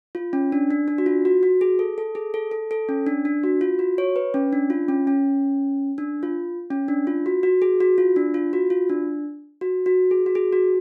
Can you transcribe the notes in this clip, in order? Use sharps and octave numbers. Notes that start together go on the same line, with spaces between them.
F4
C#4
D4
D4
D4
F#4
F4
F#4
F#4
G#4
A4
A4
G#4
A4
A4
A4
C#4
D4
D4
F#4
F4
F#4
C#5
B4
C#4
D4
F4
C#4
C#4
D4
F4
C#4
D4
F4
F#4
F#4
G#4
F#4
F4
D4
F4
F#4
F4
D4
F#4
F#4
G#4
F#4
G#4
F#4